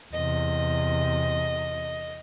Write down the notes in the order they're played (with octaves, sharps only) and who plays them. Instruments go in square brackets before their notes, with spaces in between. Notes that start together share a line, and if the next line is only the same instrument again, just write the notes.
[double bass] E2 C3 [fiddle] D#5